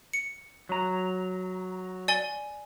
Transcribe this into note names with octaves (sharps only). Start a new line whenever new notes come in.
C#7
F#3 A#5
D5 G#5 G7